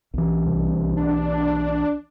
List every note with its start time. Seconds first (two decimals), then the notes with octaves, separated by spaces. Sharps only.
0.14 B1 E3
0.46 C2
0.97 D4